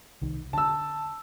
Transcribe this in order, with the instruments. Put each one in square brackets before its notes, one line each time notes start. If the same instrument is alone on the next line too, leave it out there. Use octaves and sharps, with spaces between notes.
[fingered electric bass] C2 D#3
[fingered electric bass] D3 [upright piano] A5 E6